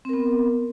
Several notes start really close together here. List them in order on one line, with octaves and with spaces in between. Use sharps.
C4 A#4 B3